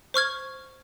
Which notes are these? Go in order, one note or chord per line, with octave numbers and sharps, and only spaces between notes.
C5 C#6 F6 G#6